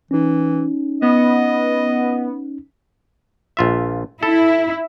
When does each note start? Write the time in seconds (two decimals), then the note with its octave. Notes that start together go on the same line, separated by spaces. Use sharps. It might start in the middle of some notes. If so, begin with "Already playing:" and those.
0.11 E3 C#4 D#4
1.02 B3 D#5
3.57 A#1 F4 E5
4.23 E4 A4